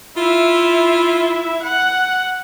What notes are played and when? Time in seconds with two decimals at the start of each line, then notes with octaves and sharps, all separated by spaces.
0.17 E4 F4 E5
1.63 F#5